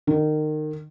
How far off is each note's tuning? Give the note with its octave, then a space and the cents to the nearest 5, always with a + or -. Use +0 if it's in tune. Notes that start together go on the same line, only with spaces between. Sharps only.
D#3 -30